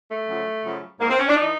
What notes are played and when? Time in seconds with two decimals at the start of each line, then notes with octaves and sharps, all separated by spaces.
0.10 A3
0.28 F#2 C#3 F3
0.65 F#2 C#3 F3
1.00 G#2 E3 A#3
1.09 C4
1.19 C#4
1.28 D4
1.36 E3 D#4